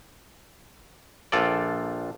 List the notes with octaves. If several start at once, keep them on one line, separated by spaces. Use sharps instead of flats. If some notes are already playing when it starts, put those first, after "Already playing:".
A#1 F4 A4 D5